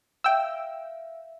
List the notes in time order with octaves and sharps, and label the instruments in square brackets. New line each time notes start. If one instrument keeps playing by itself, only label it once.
[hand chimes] E5 F5 [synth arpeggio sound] G5 E6